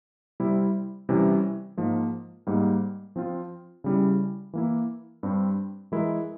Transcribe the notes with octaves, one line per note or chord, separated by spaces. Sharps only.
C3 G3 C4 E4
C3 E3 G3 C#4 E4
G#2 F3 A#3
G#2 G3 A#3
F3 C4 F4
C#3 G3 C#4 E4
E3 A#3 E4
G2 G3 C4
E3 G#3 E4 A#4